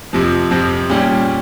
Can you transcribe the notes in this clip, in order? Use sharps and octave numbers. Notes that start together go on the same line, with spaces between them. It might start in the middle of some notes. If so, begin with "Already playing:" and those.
F2 C3 F3
F2 C3 F3
A#2 G3 C#4 G4